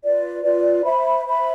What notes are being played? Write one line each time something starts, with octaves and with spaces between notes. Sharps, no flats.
F4 B4 D5
F4 B4 D5
C5 E5 B5
C5 E5 B5